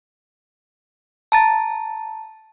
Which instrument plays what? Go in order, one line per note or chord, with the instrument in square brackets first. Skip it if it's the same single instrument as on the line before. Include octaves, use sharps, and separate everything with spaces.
[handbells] A5 A#5 A6